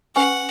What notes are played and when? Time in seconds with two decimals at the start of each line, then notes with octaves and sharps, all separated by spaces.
0.15 C#4 B4 F#5 G#5 C#6